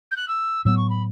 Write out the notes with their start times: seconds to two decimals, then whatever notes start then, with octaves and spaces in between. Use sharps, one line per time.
0.11 G6
0.16 F#6
0.28 E6
0.65 A2 F#3 B3 E6
0.77 C#6
0.90 B5